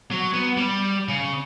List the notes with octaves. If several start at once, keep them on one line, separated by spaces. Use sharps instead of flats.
F#3
B3
G3
C#3